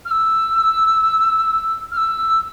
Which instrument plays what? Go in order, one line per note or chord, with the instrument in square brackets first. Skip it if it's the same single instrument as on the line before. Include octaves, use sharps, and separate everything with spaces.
[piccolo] F6
E6
F6
E6